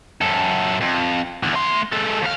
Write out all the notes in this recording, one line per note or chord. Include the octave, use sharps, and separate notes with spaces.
F#2 A4
F2
E2 D3
A3 C6
G#3 A4
D#2 F5